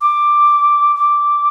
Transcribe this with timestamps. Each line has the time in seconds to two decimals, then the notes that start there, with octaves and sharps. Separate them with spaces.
0.01 D6
0.96 D6